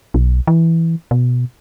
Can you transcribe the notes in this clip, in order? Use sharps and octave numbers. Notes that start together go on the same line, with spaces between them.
B1
E3
B2